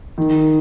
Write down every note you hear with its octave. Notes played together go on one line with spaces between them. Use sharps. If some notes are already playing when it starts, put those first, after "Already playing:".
D#3